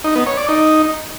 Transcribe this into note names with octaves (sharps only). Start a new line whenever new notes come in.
D#4
B3
C#5
D5
D#4